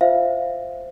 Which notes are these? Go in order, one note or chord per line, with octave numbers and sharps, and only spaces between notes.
F4 C5 E5 F5